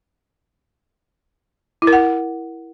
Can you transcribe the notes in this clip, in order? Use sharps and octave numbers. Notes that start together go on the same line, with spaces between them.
E4
A#4
F#5